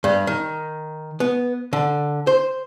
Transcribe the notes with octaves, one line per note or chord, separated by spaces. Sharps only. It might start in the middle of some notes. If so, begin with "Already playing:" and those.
G2
D#3
B3
D3
C5